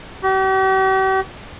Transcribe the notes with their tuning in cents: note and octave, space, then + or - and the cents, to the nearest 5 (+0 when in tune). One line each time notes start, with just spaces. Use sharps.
G4 -45